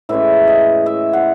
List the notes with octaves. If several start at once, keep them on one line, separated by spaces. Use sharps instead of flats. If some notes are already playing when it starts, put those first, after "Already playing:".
A2 E3 G#3 C#4 E5
D#5
E5
F#5